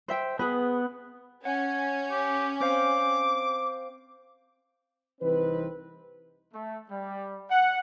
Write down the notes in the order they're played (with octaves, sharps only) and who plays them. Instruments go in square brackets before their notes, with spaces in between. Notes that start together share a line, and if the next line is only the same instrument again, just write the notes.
[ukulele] C5 E5 G5
[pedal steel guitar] B3 [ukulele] G#4 B4
[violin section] C#4 [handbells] F#5 [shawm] G#5
[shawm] G4
[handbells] C4 C5 F5 [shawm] D6
[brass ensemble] C2 E3 C4 D#4 B4
[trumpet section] A3
G3
F#5